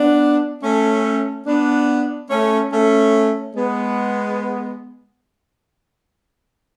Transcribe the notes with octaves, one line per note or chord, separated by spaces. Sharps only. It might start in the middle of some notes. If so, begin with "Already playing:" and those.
Already playing: B3 D4
A3 C#4
B3 D4
A3 C#4
A3 C#4
G#3 B3